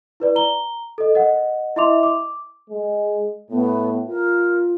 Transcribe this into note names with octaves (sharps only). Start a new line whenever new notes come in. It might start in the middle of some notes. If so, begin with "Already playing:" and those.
E4 B4 D5
A#5 G7
A4 D#5
A#4 D#5 F#5
E4 D#5 E5 C6 D6 F7
D6
G#3
A2 B3
F4 A#4